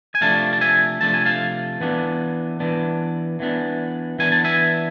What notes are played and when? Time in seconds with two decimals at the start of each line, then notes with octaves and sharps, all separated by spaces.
0.15 G#5
0.21 C3 F3 A3 D4 F5 A5
0.53 A5
0.61 E5 G#5
1.01 C3 F3 A3 D4 A5
1.14 G#5
1.26 F5 A5
1.81 E3 B3 D4
2.60 E3 B3 D4
3.40 E3 B3 D4
4.19 E3 B3 D4 G#5
4.32 A5
4.44 E5 G#5